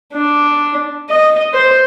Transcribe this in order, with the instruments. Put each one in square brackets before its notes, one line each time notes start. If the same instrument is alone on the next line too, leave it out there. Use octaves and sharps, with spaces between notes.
[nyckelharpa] D4
D#5
C5